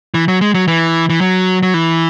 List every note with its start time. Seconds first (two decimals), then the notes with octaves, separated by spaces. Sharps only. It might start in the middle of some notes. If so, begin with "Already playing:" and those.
0.14 E3
0.28 F#3
0.41 G#3
0.54 F#3
0.68 E3
1.10 E3
1.21 F#3
1.63 F#3
1.74 E3